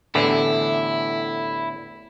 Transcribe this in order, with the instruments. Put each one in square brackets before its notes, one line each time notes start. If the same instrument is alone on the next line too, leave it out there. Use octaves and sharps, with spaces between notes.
[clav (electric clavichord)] A1 E2 D3 [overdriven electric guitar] E4